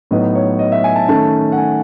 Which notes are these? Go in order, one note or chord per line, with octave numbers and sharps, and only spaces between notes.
A2 F#3 B3 D#4 D#5
C#5
D#5
E5
G#5
A5
D#3 A3 C#4 A5
F#5
G#5